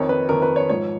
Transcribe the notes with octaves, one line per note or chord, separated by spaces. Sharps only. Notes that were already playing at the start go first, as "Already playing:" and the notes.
Already playing: F2 D#3 C#5
B4
F2 D#3 A#4
B4
C#5
G#2 F3 C#5